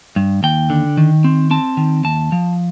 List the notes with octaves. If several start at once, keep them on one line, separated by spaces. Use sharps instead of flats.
G2
D#2 G5
D3
D#3
C4
C4 A5
D#3
D#2 A5
F3